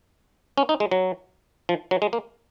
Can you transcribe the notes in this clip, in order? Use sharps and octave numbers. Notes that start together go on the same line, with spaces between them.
C#4
D#4
G#3
F#3
F3
F#3
G#3
A#3